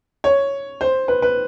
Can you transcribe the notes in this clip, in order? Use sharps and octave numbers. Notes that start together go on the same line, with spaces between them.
C#5
C5
B4
B4